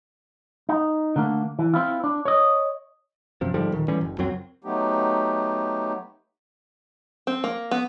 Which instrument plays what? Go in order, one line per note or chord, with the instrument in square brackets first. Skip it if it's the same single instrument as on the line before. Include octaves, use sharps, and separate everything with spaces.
[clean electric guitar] D#4
D3 A3 A#3
E3
C4 E4 F4
D4
C#5 D#5
[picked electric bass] F#2 C3 F3
G#2 D3 F3 G3
D#1 D#3
A2 E3 G3 C#4
F#1
C#2 F#2 F#3 C4
[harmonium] F#3 A3 B3 D#4 G4
[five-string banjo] C4
A#3
B3